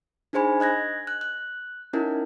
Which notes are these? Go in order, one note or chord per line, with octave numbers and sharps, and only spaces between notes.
D4 D#4 G#4 C5 G#5 B5
D#5 F#6 G#6 A#6
F#6
F#6
C#4 D#4 E4 A#4